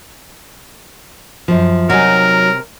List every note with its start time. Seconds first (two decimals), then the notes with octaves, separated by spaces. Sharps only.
1.48 F#2 F3
1.90 C3 F#3 D#4 A#4 G#5